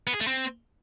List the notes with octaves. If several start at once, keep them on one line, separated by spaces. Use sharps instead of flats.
B3
G#4
A3
C4